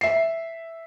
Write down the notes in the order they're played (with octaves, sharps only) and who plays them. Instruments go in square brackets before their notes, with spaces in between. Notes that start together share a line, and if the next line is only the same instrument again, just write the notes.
[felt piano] E5 C7